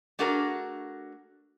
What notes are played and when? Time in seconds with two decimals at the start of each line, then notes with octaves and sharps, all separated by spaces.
0.19 A3 D4 F#4 G#4 A#4